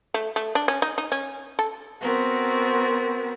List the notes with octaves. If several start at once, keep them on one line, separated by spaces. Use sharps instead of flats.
A3
A3
D4
C#4
D#4
D#4
C#4
A4
B3 C4 F#4 A#4